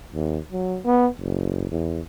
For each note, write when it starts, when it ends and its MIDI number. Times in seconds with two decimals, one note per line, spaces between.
0.14 0.39 39
0.52 0.79 54
0.85 1.07 59
1.20 1.71 30
1.71 2.00 40